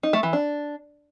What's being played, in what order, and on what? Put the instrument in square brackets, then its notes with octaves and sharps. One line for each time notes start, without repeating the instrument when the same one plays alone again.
[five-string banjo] D#4
A3
E3
D4